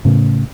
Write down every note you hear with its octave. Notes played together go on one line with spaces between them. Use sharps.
A2 C#3